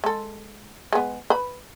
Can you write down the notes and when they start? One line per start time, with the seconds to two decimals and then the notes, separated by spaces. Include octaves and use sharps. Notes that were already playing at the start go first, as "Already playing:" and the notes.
0.04 G#3 A4
0.93 G#3 B3
1.30 B4 B5